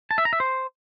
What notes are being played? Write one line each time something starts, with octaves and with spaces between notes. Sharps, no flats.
A5
E5
A#5
E5
C5